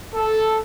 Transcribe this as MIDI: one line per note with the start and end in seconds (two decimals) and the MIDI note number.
0.14 0.57 69